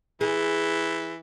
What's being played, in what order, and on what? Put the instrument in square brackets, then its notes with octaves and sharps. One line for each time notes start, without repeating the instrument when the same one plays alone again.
[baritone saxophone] E3 [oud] G#4